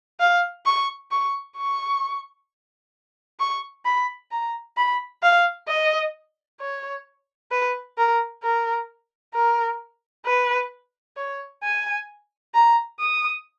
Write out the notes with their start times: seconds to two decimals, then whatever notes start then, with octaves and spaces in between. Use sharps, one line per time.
0.20 F5
0.66 C#6
1.11 C#6
1.57 C#6
3.40 C#6
3.86 B5
4.31 A#5
4.77 B5
5.23 F5
5.68 D#5
6.60 C#5
7.51 B4
7.98 A#4
8.43 A#4
9.34 A#4
10.26 B4
11.17 C#5
11.63 G#5
12.54 A#5
13.00 D#6